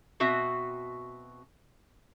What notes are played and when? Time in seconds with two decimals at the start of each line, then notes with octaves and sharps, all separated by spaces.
0.20 B2 C4 F#4 E5